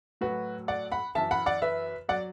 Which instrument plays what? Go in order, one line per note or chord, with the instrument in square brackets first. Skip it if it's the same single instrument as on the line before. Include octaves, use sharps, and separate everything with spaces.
[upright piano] A2 F#3 F#4 B4
D5 F#5
F#5 B5
F#2 E3 E5 A5
F#5 B5
D5 F#5
B4 E5
F#3 D5 F#5